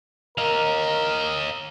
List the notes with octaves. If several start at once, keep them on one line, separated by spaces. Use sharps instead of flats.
A#4 D#5 F5